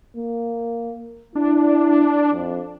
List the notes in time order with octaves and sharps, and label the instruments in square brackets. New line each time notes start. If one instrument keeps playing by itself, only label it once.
[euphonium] A#3
[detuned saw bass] D4 [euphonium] E4
[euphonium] F2